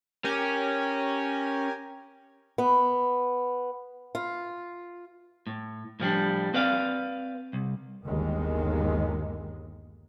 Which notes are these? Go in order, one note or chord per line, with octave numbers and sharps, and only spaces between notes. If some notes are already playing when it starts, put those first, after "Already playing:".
C#4 G4 A#4 G#5
B3
F4
A2
A2 F3 G3 D4
C4 B4 D5 F5
C2
G1 D#2 D#3 G#3